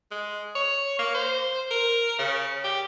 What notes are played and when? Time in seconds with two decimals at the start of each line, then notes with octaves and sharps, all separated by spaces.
0.11 G#3
0.55 C#5
0.99 A#3
1.15 C5
1.71 A#4
2.19 C#3
2.64 G4